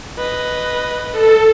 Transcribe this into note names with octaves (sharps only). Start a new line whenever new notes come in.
B4 D#5
A4